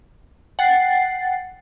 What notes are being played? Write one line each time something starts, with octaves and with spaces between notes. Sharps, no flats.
F#5 G5 A6 C7